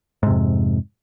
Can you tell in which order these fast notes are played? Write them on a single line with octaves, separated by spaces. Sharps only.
G#2 C3 F2